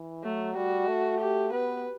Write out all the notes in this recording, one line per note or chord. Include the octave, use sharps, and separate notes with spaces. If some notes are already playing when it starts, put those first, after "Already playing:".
Already playing: E3
F#3 A3
G3 F#4
A3
G4
B3 B4